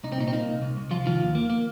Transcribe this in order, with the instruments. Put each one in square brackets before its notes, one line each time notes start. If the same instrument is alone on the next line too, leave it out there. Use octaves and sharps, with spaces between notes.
[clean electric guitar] C2 D#4
C4
A#2 D#4
C4
A#3 D#4
C2
C2
C2
C2 F3 F4
D#3 F3 F4
D#2
A#3
A#3